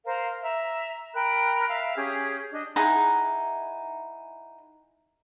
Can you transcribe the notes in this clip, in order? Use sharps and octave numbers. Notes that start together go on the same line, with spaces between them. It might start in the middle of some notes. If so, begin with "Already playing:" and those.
A#4 C5 F5
E5 A#5
A#4 G5 B5 F#6
E5 F5 E6
C#4 G4 G#4
D4 D#5 G6
D#4 E4 G#4 F#5